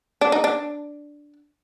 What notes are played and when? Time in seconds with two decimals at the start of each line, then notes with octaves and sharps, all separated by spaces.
0.21 D4
0.32 D#4
0.44 D4